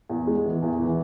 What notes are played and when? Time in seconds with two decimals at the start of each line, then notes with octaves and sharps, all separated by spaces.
0.09 E2
0.27 G#3
0.45 E3
0.62 E2
0.80 E3